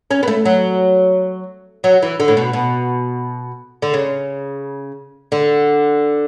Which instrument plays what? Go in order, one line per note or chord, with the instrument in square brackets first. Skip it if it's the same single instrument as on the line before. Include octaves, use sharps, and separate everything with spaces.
[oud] C#4
B3
A3
F#3
F#3
E3
D3
A2
B2
B2
D3
C#3
D3